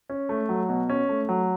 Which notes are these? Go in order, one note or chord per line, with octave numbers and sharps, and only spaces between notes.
C#4
A3
F#3
B2
C#4
A3
F#3